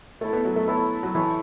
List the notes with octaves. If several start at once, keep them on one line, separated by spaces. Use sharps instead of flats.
A3 E4 A4 C#5
B3
F#3
A3
B3 E4 A4 C#5
F#3
E3 E4 A4 C#5